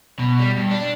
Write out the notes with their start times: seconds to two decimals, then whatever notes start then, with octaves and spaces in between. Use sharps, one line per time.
0.19 B2
0.39 G3
0.57 G2
0.71 D4